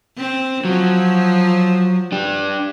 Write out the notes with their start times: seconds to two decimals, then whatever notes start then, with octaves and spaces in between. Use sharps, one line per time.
0.17 C4
0.65 F3 F#3
2.12 D4 G4